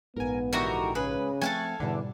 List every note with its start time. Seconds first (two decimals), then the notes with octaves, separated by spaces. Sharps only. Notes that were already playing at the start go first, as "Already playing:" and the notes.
0.16 A#1 G#2 B3 A#4 G#5
0.53 D3 E3 D#4 F#4 G4 A#4
0.95 C#2 C#3 G#4 B4
1.42 F3 A3 C4 A4 F5 G#5 C#6 F#6
1.80 E2 G#2 B2 D3 G3 D4